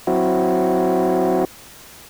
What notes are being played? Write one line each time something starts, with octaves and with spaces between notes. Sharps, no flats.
F#3 C4 E4 F#4